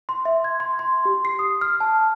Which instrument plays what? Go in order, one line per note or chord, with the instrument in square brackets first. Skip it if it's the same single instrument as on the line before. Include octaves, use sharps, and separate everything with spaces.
[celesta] C6
E5
G#6
C6
C6
G4
C7
D#6
F6
A5